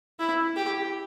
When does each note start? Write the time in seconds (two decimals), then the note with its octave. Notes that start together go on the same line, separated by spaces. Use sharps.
0.20 E4
0.57 G4